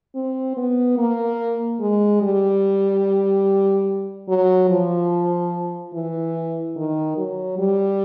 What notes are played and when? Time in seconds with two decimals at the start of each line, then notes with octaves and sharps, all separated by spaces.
0.15 C4
0.57 B3
0.98 A#3
1.80 G#3
2.22 G3
4.29 F#3
4.70 F3
5.94 E3
6.76 D#3
7.17 F#3
7.59 G3